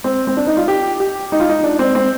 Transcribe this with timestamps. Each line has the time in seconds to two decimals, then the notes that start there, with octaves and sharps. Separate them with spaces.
0.04 C4
0.27 C4
0.37 D4
0.47 D#4
0.57 F4
0.68 G4
1.00 G4
1.32 D#4
1.40 F4
1.49 D#4
1.63 D4
1.79 C4
1.95 C4